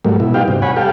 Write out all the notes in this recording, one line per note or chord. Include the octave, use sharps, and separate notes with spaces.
G#2 F#3 G3 A3 A#3
B2 E4
B3 D#4 F#4 G4 F5 G5
G2 C3
C#5 F#5 G#5 B5
G4 A4 F5 G5